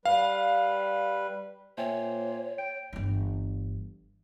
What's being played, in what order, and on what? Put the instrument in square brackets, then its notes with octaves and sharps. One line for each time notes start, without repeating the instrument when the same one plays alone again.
[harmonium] G3 B4 [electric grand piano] F5
[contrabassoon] A#2 [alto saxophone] C5 [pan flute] C#5 [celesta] E5 G5 G#5
[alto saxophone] G5 [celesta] D7
[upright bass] G1 E3